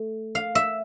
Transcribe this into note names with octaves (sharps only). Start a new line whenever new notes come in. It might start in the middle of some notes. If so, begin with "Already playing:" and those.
Already playing: A3
F5
E5